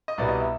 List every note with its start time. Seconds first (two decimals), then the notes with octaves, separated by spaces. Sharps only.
0.08 D#5
0.18 C2 B2 G3 D5
0.29 D#5
0.40 E5